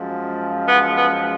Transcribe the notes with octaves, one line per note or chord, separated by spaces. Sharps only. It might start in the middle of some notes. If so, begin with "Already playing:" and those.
Already playing: F#2 F3 G#3
B3
B3